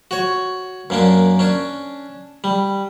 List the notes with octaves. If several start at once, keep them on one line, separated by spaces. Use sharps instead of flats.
F#4 C#5
F#2 A#3 D4
C#4 D4
G3